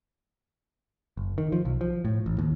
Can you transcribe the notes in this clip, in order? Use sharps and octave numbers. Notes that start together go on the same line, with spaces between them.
F#1
D#3
F3
B1
F3
A2
A1
D#2